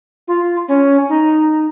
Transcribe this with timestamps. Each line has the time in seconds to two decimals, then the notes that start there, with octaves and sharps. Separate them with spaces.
0.28 F4
0.68 C#4
1.09 D#4